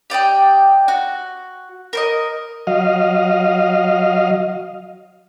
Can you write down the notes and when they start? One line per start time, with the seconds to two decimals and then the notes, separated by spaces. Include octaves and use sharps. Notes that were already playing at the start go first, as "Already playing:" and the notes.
0.10 G4 D5 D#5 G5
0.88 F#4
1.93 A#4 C5 D#5
2.67 F#3 D#5 F5